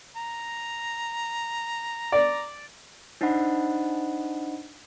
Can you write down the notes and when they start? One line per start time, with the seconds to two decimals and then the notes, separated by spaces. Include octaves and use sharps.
0.16 A#5
2.12 D5
3.21 D4 D#4 C5 D#5 F#5 B5